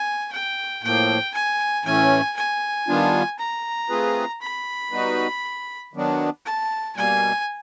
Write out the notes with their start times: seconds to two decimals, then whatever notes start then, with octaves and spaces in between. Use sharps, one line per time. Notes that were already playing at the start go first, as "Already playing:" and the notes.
Already playing: G#5
0.32 G5
0.83 A2 F3 A#3 G5
1.34 G#5
1.85 A2 E3 A3 C#4 G#5
2.37 G#5
2.88 D#3 G3 B3 D4 F4
3.38 A#5
3.89 A3 C4 F4 G#4 B4
4.41 B5
4.92 G3 B3 D#4 F#4 B4
5.94 D#3 F#3 B3 D4
6.45 A5
6.96 B2 G3 A#3 G#5